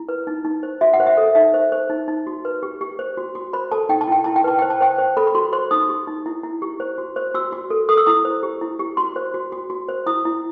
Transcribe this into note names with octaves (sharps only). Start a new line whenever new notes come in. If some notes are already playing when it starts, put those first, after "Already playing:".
Already playing: E4
B4
D#4
D#4
C5
F#4 E5
F#5
C5
E5
A4
D#4 E5
C5
C5
D#4
D#4
F#4
B4
G4
G4
C5
F#4
F#4
C5 B5
A4 A5
D#4 G5
A5
E4 G5
E4 A5
G5
B4 A5
C5 G5
A5
C5 G5
C5
A4 B5
B5
F#4 C6
C5 C6
D#4 D#6
G4
D#4
E4
E4
G4
C5
F#4
C5
F#4 E6
F#4
A4
A4 D#6
E6
E4 D#6
C5
G4
E4
G4
F#4 C6
C5
F#4
F#4
F#4
C5
E4 D#6
E4